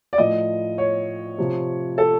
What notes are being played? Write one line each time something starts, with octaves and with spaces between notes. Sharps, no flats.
D5
A2 F3 D#5
C#5
C3 F3
A4